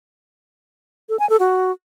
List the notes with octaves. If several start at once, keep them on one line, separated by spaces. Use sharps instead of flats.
A4
G#5
A4
F#4